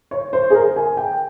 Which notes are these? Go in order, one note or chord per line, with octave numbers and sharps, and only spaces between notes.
C#5
C5
G#4
A#4
G#5
G5